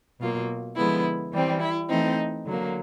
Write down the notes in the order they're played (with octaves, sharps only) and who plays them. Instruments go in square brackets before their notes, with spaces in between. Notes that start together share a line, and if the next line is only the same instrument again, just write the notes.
[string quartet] B2 F#3 A#3 F4
D3 F3 G#3 B3 E4
E3 G3 C4
E4
E3 A3 C4 D#4
D3 F#3 A#3